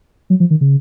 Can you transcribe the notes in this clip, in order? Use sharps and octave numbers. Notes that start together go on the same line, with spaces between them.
F#3
F3
D#3
C#3